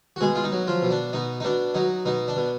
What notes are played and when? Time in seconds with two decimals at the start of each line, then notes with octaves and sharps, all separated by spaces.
0.16 F#4
0.21 B2 G#3 G#4
0.35 F4
0.44 D#4
0.52 F#3
0.67 F3 F4
0.82 B2
0.91 D4
1.13 B2 D#4
1.40 D#4
1.44 B2 D4
1.74 F#3 D#4
2.05 B2 D#4
2.28 D4
2.36 B2